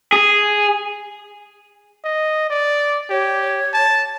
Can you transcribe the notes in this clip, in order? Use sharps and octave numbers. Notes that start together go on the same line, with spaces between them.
G#4
D#5
D5
G4 C#5
A5